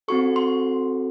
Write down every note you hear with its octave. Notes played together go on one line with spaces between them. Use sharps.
C4 F#4 A4 C#6
C6